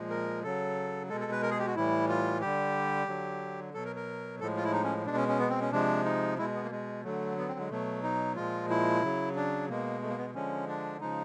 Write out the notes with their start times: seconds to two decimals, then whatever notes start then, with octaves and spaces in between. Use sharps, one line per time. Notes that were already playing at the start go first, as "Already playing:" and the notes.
Already playing: A#2 F3 G#3
0.10 A#4
0.43 C#3 F#3 A4
1.09 G#3 A4
1.12 B2
1.21 A4
1.32 B4
1.42 A#4
1.51 G#4
1.59 G4
1.67 F#4
1.76 A2 E3 G3 E4
2.08 F4
2.41 D3 G3 G4
3.08 D3 F#3
3.74 B2 F#3 A4
3.85 A#4
3.96 A#4
4.40 A2 F3 G#3 A4
4.57 F4
4.64 E4
4.73 D#4
4.84 C#4
5.06 B2 G#3 D4
5.17 C#4
5.29 C#4
5.39 B3
5.50 C4
5.61 C#4
5.72 C3 F3 G#3 D4
6.05 D#4
6.38 B2 G#3 E4
6.54 B3
6.63 A#3
6.71 G#3
7.04 D3 F#3 A3
7.38 B3
7.48 C4
7.60 G#3
7.70 B2 F#3 A3
8.03 D#4
8.36 A#2 F3 G#3 F4
8.70 E4
9.03 C#3 F#3
9.36 D4
9.68 B2 G#3 A#3
10.02 A3
10.10 A#3
10.18 B3
10.35 D3 F3 G#3 C#4
10.68 D4
11.01 C#3 F3 G#3 D#4